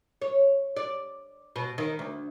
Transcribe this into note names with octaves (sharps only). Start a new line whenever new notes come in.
C#5
D5
B2
D#3
D2